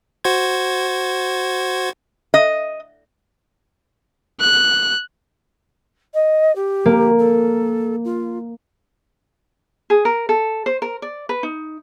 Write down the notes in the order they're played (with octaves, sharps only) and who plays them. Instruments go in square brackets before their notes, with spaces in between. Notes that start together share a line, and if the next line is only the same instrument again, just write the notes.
[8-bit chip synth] F#4 C5 G#6
[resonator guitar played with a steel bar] D#5
[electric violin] F#6
[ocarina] D#5
G4
[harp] A#3
[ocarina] A4
F4
[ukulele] G#4
A#4
A4
C5
A#4
D5
B4
D#4